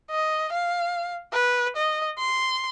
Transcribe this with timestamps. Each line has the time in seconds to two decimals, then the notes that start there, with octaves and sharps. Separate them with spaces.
0.11 D#5
0.53 F5
1.33 B4
1.77 D#5
2.19 C6